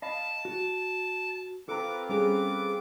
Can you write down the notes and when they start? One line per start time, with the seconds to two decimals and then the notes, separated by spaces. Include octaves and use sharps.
0.02 D#5 F5 A5 B5
0.45 F#4
1.69 C4 F4 A4 B4 A#5 D6
2.09 G3 C#4 G#4 D6